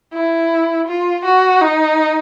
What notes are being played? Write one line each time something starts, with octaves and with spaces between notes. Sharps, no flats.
E4
F4
F#4
D#4